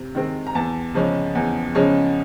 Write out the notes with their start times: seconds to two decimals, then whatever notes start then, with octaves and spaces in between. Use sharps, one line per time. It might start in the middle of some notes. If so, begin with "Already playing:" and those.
Already playing: C3
0.15 D#3 G#3 C4
0.47 A#5
0.55 E2 A5
0.94 C#3 F3 G#3 C#4
1.35 E2
1.75 C#3 F3 G#3 C#4